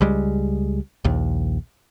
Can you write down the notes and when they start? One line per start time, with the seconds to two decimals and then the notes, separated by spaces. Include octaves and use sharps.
0.01 C#2 G3 G#3
1.04 A#1 D#2